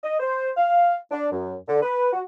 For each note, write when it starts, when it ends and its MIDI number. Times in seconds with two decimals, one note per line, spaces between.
0.04 0.17 75
0.20 0.51 72
0.57 0.96 77
1.11 1.28 62
1.32 1.54 42
1.68 1.82 50
1.82 2.09 71
2.13 2.22 66